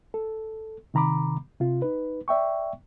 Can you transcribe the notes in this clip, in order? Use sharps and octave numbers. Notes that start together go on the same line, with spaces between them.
A4
C3 D#3 A#5 B5 D6
C3 F4
D#4 B4
D5 E5 G5 C#6